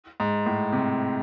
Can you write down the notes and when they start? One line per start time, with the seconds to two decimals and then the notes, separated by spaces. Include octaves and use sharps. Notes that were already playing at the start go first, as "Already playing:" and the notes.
0.20 G#2
0.46 A2
0.72 C3